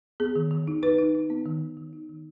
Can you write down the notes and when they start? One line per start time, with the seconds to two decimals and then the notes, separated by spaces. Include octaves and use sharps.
0.20 B3 G#4
0.36 D#3
0.51 D#3
0.68 D#4
0.83 D#4 B4
0.98 D#4
1.15 D#4
1.30 B3
1.46 D#3
1.61 D#3
1.77 D#3
1.93 D#4
2.09 D#3